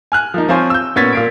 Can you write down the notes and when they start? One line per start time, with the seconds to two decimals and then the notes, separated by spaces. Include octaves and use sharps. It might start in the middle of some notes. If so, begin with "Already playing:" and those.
0.12 G#5 F6 F#6
0.34 F3 A#3 D#4
0.48 F3 C4 F4 C5 C#5 G#5
0.70 E6 G6
0.96 A#2 B3 C#4 G#6 A6 B6
1.13 A#2 F5 D7